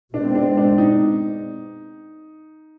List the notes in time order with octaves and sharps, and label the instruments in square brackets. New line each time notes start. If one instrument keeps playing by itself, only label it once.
[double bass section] B2 G#3 C4 [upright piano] D4
[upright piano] D4
D4
D#4